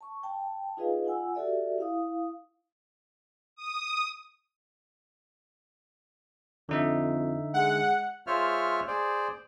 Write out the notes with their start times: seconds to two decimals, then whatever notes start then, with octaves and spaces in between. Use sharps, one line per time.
0.01 A5 C#6
0.23 G5 A5
0.77 D#4 F4 G#4 B4 D#5 F5
1.05 F4 F#5 G#5 E6
1.35 F#4 G4 A4 D5 E5
1.78 E4 F5 D#6
3.56 D#6
6.69 F2 D3 D#4 E5
7.54 G#3 F#5
8.27 G#3 F4 C5 C#5 E5 F6
8.87 G#4 C5 D5